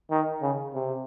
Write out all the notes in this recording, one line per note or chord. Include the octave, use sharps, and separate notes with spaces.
D#3
C#3
C3